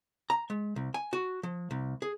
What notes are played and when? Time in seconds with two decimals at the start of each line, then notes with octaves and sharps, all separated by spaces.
0.30 A#5
0.50 G#3
0.76 C2
0.94 G#5
1.13 F#4
1.43 F3
1.71 C2
2.02 G#4